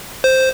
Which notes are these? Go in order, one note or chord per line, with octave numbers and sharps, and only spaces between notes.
C5